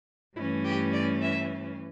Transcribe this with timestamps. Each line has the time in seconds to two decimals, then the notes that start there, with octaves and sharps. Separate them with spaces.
0.36 G2 E3 A3 C#4 E4
0.65 G4
0.93 D5
1.22 E5